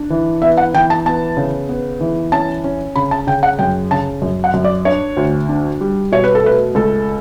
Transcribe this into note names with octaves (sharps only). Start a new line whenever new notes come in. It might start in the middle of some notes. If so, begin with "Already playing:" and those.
Already playing: D4
E3
B3 E5
F#5
E3 G5
A5
B3 A5
C#3
B3
E3
C#4 A5
C#4
C#3 B5
A5
C#3 G5
F#5
F#2 G5
C#3 A5
F#2
F#5
F#2
D5
D4 C#5
D2
D4
G3
B2 C#5
B4
A4
A3 B4
C#2 A4